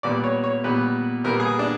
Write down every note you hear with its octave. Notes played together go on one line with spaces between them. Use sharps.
A#2 G3 B3 D5
C#5
C#5
A#2 G3 B3 B4
A#2 G3 B3 A#4
G#4
D4